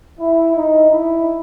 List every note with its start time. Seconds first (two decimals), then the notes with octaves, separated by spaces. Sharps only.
0.20 E4
0.56 D#4
0.91 E4